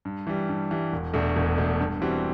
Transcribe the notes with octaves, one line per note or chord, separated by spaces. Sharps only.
G2
E3 G3
G2
E3 G3
E1
E2 B2 A3 D4
E1
E2 B2 A3 D4
G2
E3 G3 C4 F#4